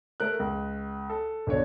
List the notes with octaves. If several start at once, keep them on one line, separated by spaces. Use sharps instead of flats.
A3 A#4 F#6
C#2
A4
B1 D3 C#5